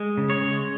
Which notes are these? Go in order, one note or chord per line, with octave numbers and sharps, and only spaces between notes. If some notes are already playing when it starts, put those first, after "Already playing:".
Already playing: G#3
C#3
C#5
G#3